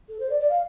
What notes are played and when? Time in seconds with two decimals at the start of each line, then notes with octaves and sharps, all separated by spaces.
0.09 A4
0.19 C5
0.30 D5
0.40 D5
0.49 F5